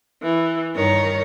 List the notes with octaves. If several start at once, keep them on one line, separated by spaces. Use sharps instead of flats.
E3
G2 D#3 C#5 A#5